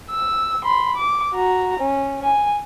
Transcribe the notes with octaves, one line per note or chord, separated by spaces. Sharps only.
E6
B5 C6
D6
F#4 A#5
C#4
G#5